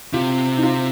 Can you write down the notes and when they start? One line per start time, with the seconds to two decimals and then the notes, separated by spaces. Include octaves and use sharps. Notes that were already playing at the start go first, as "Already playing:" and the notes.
0.13 C3 F4
0.58 D#4
0.63 F4